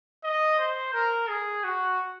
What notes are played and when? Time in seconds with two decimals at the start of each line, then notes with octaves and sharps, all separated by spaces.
0.24 D#5
0.59 C5
0.94 A#4
1.29 G#4
1.64 F#4